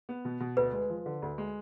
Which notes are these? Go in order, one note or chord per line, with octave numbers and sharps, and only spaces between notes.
B3
B2
B2
D2 B4
G#3
F3
D3
D2
G#3